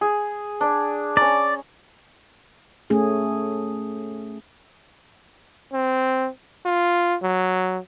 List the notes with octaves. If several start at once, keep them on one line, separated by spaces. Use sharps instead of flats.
G#4
D4
C#4 D5 A#5
A3 C#4 G#4
C4
F4
F#3